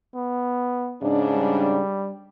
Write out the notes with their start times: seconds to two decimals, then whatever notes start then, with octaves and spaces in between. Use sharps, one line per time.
0.15 B3
1.02 G#2 C#3 D4
1.36 G3